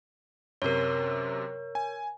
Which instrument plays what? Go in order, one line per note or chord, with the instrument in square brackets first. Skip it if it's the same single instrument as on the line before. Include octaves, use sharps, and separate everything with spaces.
[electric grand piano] F#2 C3 [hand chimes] A#4 C#5
[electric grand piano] G#5